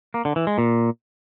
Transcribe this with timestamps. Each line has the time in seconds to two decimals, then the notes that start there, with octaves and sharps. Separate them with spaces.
0.14 A#3
0.25 D3
0.36 E3
0.47 G#3
0.58 A#2